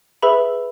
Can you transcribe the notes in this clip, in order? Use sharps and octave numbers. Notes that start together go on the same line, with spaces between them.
G#4 B4 E5 B5 E6